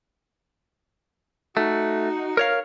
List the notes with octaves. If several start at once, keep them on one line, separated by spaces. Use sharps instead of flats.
A3 D#4 F#4
A#4 C#5 F5